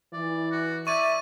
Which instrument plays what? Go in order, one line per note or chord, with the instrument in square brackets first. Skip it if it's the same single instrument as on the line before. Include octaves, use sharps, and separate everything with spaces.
[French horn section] E3 [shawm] D5
[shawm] F#4
[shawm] D5 [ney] E5 [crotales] C#6 D#7